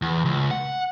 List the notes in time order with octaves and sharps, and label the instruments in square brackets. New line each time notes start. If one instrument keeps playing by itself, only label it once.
[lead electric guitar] E2
C#2
F#5